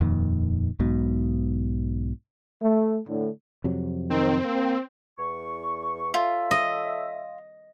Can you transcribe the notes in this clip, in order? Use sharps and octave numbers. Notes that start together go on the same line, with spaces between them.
D#1 F2 A#2 D#3
B1 G#2 B2
A3
A2 D3
F2 C3 F#3
D#3 C4
A#3
E2 C#6
F4 A4 C#5 E5
D#5